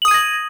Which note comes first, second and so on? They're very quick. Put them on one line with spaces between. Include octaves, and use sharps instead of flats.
F#7 D#6 D#7 G#6 A#6